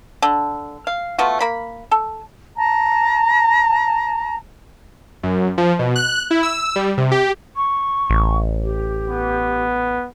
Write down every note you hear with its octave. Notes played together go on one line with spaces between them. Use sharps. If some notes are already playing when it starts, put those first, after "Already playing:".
D3
F5
A3 B3 F4 F#4
A#3 B5
A4
A5 A#5
F#2
F3
B2
F#6
E4
E6
G3
C3
G4
C#6
A1
G4
B3